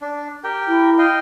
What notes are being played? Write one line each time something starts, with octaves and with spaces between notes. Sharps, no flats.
D4
G4 A#4 G5
E4
D#5 F5 G5